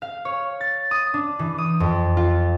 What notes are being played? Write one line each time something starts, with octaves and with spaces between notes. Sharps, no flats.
F5
C#5
A6
D#6
D4
E3
D#6
F2
F4